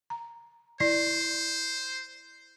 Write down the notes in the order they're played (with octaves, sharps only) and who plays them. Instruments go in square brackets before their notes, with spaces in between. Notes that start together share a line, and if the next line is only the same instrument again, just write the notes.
[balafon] A#5
[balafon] E4 D5 [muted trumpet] C5 [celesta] C7